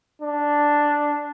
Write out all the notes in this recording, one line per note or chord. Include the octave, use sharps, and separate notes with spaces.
D4